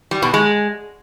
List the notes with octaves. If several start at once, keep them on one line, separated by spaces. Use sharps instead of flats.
G3
B2
G#3